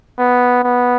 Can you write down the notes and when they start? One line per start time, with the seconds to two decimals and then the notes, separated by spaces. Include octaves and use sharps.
0.19 B3
0.64 B3